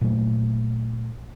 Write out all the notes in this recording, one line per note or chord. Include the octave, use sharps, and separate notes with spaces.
A#2 F#3 A3